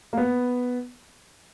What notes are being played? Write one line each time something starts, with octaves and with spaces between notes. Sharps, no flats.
A#3
B3